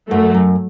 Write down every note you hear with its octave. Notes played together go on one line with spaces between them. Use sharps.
F#2 F#3 A3
F#2